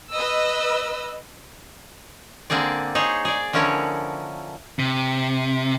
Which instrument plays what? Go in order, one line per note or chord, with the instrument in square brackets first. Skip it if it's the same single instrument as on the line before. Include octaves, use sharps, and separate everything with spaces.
[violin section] B4 D#5 E6
[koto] D3 A#3 C4 G#4 D5
D#4 G#4 C5 C#5
G#4 D5
D3 F3 C#4 E4 A#4 C#5
[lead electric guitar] C3